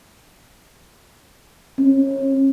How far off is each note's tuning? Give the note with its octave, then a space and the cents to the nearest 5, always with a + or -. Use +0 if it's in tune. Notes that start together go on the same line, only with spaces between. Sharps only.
C#4 -35